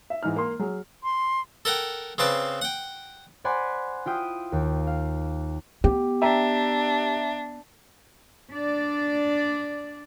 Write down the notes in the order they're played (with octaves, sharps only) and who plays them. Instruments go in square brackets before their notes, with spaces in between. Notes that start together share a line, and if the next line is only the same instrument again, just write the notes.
[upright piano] E5
G#2 E3 D#4 F6
A#3 C6
F#3 G#4
[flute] C6
[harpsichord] A4 A#4 F#5 G5
C#3 C4 B4 A5 D6
F#5 G5
[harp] C5 D5 F#5 G#5 B5 C6
E4 F4 G5 D#6
D#2
F5
[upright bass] B3 [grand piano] G4
[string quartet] D4 [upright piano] E5 G5 A#5
[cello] D4 D5